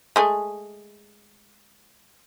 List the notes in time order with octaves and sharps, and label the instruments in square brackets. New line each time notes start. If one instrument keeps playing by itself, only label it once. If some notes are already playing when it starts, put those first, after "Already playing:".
[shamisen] G#3 A3 G#4